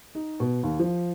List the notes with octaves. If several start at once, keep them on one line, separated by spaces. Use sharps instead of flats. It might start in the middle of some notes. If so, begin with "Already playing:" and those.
D#4
B2
D#2
F3